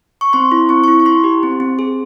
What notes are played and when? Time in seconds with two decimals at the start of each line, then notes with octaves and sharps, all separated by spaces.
0.21 C#6
0.33 C4 C6
0.52 E4
0.69 C4 C#6
0.84 E4 C#6
1.00 C#6
1.05 E4 C6
1.24 G4
1.43 C4
1.60 C4
1.79 G#4